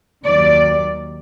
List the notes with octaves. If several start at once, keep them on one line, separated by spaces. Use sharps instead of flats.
D#2 D#3 F#3 D5